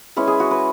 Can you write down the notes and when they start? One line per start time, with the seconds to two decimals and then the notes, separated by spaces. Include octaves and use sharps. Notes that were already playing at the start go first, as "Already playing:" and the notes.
0.16 G#3 C#4 E4 B4
0.27 G#4
0.40 F#4
0.51 B4